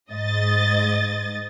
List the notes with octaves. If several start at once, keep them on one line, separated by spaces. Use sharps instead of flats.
G#2 D#5 A6